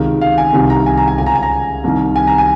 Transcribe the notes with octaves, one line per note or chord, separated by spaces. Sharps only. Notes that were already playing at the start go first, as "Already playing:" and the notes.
Already playing: C#2 C3 D#3
F5
G#5
C2 C3 D#3
A#5
G#5
A#5
G#5
C#2 C#3 G#5 A#5
G#5
A#5
C2 C3 D#3
G#5
A#5
G#5